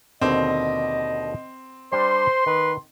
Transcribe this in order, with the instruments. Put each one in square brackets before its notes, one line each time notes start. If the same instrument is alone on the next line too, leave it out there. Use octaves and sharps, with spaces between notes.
[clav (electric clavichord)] D#2 B2 D3 [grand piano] C4 [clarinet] D#5
[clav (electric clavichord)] G3 D4 [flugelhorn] C5 [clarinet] C6
[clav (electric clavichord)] D#3 [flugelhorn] B4